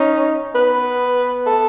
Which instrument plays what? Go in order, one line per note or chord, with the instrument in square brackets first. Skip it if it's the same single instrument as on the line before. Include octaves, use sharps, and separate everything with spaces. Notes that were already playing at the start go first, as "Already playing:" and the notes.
Already playing: [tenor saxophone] C#4 [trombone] D#4
[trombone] B3 [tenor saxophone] B4
[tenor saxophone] A4